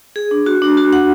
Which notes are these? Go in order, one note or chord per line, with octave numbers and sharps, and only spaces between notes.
G#4
D4
F#4
D4
F#4
F#5